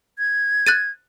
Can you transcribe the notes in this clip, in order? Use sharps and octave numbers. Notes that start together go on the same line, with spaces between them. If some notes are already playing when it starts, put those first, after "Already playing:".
G#6
F#6 A6 D#7